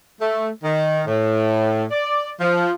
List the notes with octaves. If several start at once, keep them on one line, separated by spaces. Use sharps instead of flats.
A3
D#3
A2
D5
F3